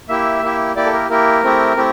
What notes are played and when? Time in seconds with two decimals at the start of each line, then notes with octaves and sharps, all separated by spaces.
0.08 A#3 E4 G4 E5
0.42 A#3 E4 G4
0.76 A#3 E4 G4 D5
0.86 A4
0.93 A#4
1.09 A#3 E4 G4 A#4
1.43 A3 C4 E4 G4
1.77 A3 C4 E4 G4